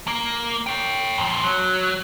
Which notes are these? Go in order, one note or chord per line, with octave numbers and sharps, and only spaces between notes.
A#3
C#5 G5
F2 A#2
F#3